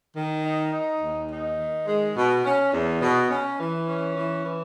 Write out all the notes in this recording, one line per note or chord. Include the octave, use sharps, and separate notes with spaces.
D#3
D#4
D#4
D#2
D#4
D#3
G#3
B2
C#4
E2
B2
C#4
E3
C#4
E3
E3